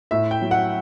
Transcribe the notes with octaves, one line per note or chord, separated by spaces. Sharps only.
A2 E5
G5
F#3
F#5